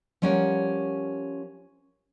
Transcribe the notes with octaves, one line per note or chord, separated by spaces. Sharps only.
F3 G3 C#4 A#4 F#5